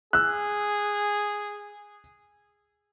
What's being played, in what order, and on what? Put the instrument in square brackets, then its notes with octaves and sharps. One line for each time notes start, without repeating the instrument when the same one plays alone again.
[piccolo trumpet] G#4 [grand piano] E6 F#6